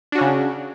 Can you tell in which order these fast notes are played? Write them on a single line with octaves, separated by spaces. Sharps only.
D4 F#4 C#4 C#3